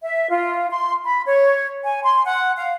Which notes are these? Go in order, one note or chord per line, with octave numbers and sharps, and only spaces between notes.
E5
F4
C6
B5
C#5
G#5
C6
F#5
F5